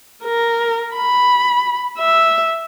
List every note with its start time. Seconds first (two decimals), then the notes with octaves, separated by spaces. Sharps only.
0.23 A#4
0.95 B5
1.99 E5